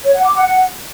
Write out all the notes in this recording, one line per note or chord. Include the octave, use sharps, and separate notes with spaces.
C#5
F#5
D6
F#5
F#5